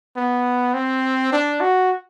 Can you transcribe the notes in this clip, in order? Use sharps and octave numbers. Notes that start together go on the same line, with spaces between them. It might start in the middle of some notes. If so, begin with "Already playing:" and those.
B3
C4
D4
F#4